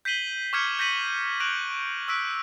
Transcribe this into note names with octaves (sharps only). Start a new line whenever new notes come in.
G6 B6 C7 D#7 F#7 G7
C#6 D6 F6 G6 G#6 C#7
G6 A#6 B6 D#7 F#7 G7
C#6 F#6 B6 D7 F7 F#7
C#6 E6 F#6 B6 D7